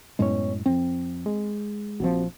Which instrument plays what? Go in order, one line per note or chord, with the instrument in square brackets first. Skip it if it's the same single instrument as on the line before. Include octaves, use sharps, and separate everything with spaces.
[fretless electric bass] F#2 A2 G#3 [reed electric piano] B3 C#5
[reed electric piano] F2 F3 [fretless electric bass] C4
[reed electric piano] G#3
[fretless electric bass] A#1 C#3 F3 [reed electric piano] C4 F#4